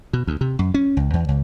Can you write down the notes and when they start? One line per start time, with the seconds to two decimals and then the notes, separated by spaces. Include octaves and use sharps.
0.13 B2
0.27 D2
0.41 C3
0.59 F#2
0.74 C#4
0.97 C#2
1.14 E2
1.29 C#2